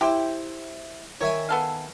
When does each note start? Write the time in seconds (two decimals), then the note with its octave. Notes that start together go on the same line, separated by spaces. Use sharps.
0.01 E4 G4 C5 G5
1.21 D#3 C#5 E5 G#5
1.49 B3 A4 F5